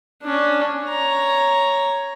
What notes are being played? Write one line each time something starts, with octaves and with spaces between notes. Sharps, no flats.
C#4 D4
C#5 A#5